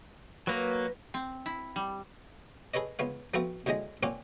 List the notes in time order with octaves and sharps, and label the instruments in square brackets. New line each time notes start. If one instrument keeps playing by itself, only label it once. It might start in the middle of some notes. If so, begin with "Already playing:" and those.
[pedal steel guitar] F#3 A#3 [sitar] B4
[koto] C4
E4
G3
[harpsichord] G#4 A4 B4 C#5 D#5
C#2 B3 C#5 F5
F3 A3 B3 C4 F4 F#4
D2 A2 D3 G#3 D#5
A#2 C4 C#4 F#5 C#6 D6